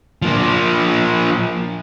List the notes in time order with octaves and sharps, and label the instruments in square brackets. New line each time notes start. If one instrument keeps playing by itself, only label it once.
[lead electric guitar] F3 A#3